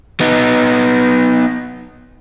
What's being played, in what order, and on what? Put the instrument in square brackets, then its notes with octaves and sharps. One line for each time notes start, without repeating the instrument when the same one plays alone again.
[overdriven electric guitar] B3 D#4